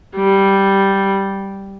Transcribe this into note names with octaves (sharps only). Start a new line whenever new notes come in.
G3